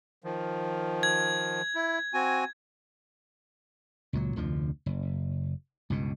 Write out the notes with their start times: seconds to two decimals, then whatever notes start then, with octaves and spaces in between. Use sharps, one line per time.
0.24 D#3 F3
1.03 G#6
1.75 E4
2.14 C4 F#4 G#5
4.13 C#2 A#2 F#3
4.36 F1 D2 D3 F3
4.86 F#1
5.90 C#2 G2 B2